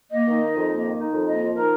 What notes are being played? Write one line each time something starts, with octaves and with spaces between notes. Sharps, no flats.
A#3 D#5
D#3
D#4
F2
A#3
D#3
D#4
F2
A#3 D#5
F3
D#4 A#4